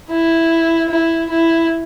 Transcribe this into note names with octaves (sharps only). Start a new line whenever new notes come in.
E4
E4
E4